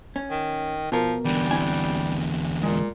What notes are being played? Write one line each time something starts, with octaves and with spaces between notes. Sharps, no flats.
C#4
D#3
B2 F3 A#4
E2 D3 G3
C4 E4 G#5
A#2 G#3